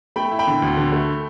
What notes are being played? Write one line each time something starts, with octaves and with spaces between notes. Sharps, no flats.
A3 G5 B5
E4
G5 B5
D3
D2
D3
A3